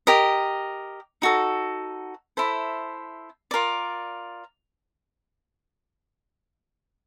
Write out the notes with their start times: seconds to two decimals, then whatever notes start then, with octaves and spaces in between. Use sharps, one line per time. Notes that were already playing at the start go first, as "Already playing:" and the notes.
0.07 G4 A#4 D#5
1.22 D#4 F#4 A4
2.37 E4 A4 C5 E5
3.51 F4 A#4 D5